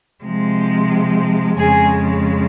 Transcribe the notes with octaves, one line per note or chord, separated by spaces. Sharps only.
C3 F3 G#3
F2 C#3 G#3 G#4 G#5